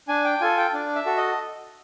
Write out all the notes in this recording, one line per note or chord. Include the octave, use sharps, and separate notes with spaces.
D4 G#5
G5
F4 A4 G#5
G5
D4
E5
F#4 A4
D#5